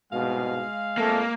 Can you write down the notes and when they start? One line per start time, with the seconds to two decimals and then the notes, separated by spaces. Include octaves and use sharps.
0.12 C2 G#2 B2 G#3 F5
0.98 F2 A3 A#3